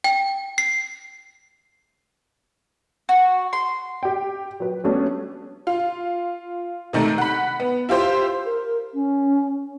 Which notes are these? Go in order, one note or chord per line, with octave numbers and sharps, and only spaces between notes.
G5
C7
F#4
C6
G4 G5
F#3 B4
F#3 G3 A3 B3 C#4 D4
F4
C3 D#3 A3 D#4
F#5 B5
B3
E4 F4 G4 C5
A#4
C#4